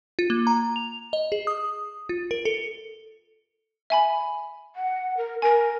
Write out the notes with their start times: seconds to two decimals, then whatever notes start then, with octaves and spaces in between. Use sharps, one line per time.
0.19 F4
0.30 A#3
0.47 A#5
0.76 F7
1.13 D#5
1.32 G#4
1.47 D#6
2.09 F4
2.31 A#4
2.45 A4
3.90 E5 G#5 B5
4.76 F#5
5.17 A#4
5.42 A#4 G#5